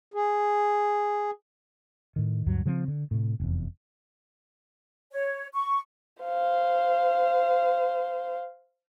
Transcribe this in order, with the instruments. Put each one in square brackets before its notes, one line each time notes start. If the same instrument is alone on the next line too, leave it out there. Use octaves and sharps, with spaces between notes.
[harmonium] G#4
[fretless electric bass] A2 D#3
D2 G2 F#3
C#3 F3 A3 C4
D3
A2 C3
F1 E2
[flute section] C#5
C#6
[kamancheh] C5 F5